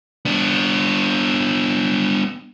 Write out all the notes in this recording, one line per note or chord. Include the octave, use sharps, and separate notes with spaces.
B3 D4